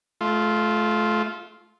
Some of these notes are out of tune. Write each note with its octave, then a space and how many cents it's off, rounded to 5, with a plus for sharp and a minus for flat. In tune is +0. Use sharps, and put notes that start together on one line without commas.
A3 -30 F4 +0